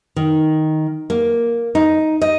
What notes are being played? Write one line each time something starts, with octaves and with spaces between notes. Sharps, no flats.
D#3
A#3
D#4
D#5